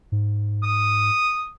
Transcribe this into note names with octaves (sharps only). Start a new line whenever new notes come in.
G#2
D#6